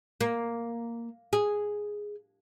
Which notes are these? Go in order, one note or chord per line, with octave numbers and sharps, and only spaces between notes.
A#3
G#4